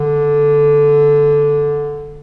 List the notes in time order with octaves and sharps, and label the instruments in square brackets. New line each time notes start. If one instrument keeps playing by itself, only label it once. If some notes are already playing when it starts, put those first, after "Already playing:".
Already playing: [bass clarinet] D3